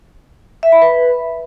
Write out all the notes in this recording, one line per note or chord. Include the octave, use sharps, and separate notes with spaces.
E5
B5
B4